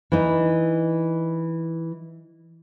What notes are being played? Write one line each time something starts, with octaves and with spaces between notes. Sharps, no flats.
E3 D#4